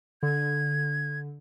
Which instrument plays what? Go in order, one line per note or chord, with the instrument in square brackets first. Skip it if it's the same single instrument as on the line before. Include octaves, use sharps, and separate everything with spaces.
[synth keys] D3 [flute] G#6